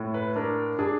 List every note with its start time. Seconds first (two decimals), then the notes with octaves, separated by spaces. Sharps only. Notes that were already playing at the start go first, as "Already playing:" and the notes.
Already playing: A2 A3
0.14 B4
0.36 D4 A#4
0.79 D4 G#4